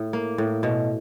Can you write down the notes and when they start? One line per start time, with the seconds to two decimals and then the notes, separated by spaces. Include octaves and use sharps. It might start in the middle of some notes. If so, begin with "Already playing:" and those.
Already playing: A2
0.13 A#3
0.38 A2
0.63 B2